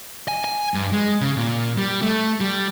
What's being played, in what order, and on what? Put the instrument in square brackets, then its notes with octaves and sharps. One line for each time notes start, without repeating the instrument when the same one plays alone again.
[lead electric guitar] G#5
G#5
G2
G#3
C#3
A#2
G3
A3
G3